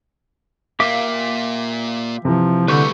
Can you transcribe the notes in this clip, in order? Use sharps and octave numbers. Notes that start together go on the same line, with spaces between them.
A#2 A#3 G4 E5 F5 D6
C3 E3 F3
D3 G3 A3 B4 C#6 G6